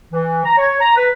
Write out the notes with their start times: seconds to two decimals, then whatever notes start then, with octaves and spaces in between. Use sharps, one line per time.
0.13 E3
0.45 A#5
0.58 C#5
0.81 A#5
0.96 B4